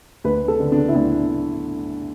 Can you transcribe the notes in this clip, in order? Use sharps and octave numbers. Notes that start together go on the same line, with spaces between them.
D2 B4
A4
D3
D4
E4
D2 D4